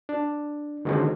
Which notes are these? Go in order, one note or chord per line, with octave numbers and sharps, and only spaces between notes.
D4
D3 D#3 G#3 C#4 F#4 C5